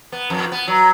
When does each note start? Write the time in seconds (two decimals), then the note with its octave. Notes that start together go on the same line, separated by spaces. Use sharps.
0.12 B3
0.30 F2
0.52 B3
0.68 F#3